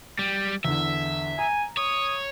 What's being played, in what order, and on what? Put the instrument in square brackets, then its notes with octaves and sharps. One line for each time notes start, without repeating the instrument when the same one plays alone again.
[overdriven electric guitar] G3
[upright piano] E2 D3 [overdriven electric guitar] E5
[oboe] G#5 [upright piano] A#5
[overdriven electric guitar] C#5 [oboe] D#6